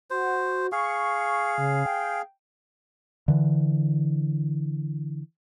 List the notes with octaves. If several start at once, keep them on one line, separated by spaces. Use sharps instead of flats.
F#4 C5
G#4 F5 C#6
C#3
G5
D3 E3